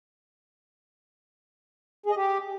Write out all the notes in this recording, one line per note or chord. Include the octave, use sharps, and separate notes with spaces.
G#4
D#5
G4